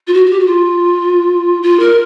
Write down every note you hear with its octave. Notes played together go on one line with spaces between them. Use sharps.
F4
F#4
F#4
G4
F#4
F4
F4
A#4